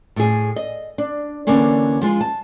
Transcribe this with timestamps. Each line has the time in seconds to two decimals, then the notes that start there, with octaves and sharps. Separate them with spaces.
0.16 A2 G#4
0.56 D#5
0.98 D4
1.47 D3 E3 A#3 C#4 D4
2.01 F3 G#3 F4
2.21 A5